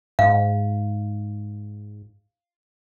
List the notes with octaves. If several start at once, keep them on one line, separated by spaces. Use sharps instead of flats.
G#2 F5